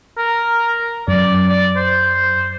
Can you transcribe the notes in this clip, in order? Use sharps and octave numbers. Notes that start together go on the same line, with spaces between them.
A#4
F#2 D5
D5
C5